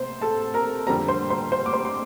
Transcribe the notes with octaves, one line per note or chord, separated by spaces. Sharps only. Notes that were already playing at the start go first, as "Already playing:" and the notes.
Already playing: C3 C4 C5 C6
A4 A5
A#4 A#5
F2 D3 G3 C4 A#4 A#5
C5 C6
C5 C6
C5 C6
D6
C5 C6
C6